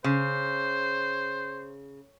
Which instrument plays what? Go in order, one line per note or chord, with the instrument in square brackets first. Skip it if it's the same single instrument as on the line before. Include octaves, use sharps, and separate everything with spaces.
[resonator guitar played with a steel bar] C#3 [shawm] C5